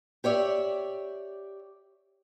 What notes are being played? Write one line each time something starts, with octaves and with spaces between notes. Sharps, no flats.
G4 C#5 D5 E5